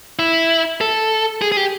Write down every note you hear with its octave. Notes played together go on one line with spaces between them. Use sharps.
E4
A4
G#4
G#4
G4